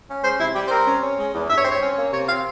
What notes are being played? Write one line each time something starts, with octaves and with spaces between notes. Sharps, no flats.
C#4
G#3 C5
C3 E4
G3 G4
C5
C4 A#4
C#4
C#4
G#3
E2
G2 E5
C#5
C4 C5
C#5
C#4
A#3
C3 C#5
C4 F5